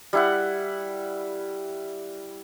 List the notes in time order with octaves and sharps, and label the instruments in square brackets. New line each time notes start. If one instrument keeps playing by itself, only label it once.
[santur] G3 E4 F#5